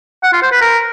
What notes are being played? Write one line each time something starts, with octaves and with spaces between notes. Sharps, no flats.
F#5
F4
C5
B4
A#4